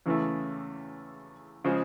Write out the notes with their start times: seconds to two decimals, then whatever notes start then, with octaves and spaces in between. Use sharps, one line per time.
0.06 E2 C#3 E3 A3
1.64 C#3 F3 G#3